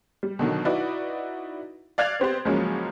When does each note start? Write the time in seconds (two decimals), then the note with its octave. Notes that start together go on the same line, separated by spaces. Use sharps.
0.23 G3
0.39 B2 D3 D#3 F#3
0.65 D#4 E4 F#4 B4 D5
1.98 D5 F5 F#6 G#6 A6 F7
2.19 B3 C4 G4 C5
2.45 C#2 F3 F#3 G#3 A#3 C#4